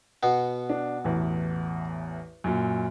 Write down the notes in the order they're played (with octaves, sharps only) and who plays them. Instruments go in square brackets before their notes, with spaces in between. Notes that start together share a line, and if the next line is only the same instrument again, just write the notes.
[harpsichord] B2 B3
[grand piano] D4
A1 E2
F#2 A#2